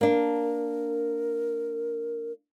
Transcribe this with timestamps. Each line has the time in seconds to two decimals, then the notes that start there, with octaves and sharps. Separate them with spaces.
0.01 A#3 D4 A#4